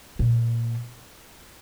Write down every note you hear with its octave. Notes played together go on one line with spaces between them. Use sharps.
A#2